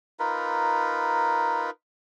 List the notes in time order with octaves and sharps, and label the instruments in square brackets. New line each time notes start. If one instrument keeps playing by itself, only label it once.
[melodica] D#4 F4 A#4 B4